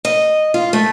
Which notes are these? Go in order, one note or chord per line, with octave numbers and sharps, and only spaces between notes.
D#5
F4
A3